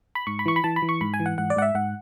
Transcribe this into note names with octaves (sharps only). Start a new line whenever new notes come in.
B5
G#2 C#6
B5
E3 C#6
B5
E3 A5
B5
E3
C#6
G#2 B5
G#5
E3
F#5
G#2 F#5
D5
G#2 F#5
E5
G#2 F#5